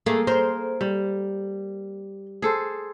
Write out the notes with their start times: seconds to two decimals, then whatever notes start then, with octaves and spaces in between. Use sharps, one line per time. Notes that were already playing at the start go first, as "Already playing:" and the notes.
0.06 A3 A#3 G#4
0.27 A#4 C5
0.81 G3
2.42 G#4 A4 C5